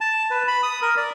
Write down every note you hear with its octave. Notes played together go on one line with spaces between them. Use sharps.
A5
B4
B5
D#6
A#4
D5